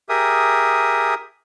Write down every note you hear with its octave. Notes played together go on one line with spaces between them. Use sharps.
G4 G#4 A#4 E5 D#6